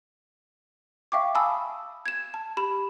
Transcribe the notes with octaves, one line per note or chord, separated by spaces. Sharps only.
E5 F5 G5 C#6 D6
F5 G#5 A5 B5 D#6 E6
G#6 E7
A5
G4 B5 E7